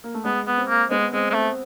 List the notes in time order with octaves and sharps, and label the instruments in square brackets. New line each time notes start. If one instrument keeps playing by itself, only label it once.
[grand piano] A#3
A3
[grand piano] G#3 [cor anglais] B3
[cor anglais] B3
[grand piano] C4
[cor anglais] A#3
[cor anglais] G#3 [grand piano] B3
[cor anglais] G#3 [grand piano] C4
[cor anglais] G#3
[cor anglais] A3 [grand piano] C4